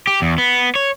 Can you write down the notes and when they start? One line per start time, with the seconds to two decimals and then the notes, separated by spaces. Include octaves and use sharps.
0.07 G4
0.22 E2
0.38 B3
0.75 C#5